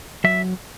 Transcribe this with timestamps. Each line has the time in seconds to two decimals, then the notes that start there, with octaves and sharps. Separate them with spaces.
0.24 F#3 E5